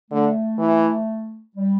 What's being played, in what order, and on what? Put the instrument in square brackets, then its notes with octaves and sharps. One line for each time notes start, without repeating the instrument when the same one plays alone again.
[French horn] D3 [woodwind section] A3
[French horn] E3
[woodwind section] G3